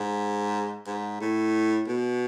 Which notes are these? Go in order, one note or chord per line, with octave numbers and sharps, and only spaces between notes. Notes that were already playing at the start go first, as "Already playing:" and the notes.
Already playing: G#2
G#2
A2
B2